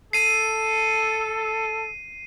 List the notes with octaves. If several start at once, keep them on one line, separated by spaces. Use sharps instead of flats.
A4 C7 D#7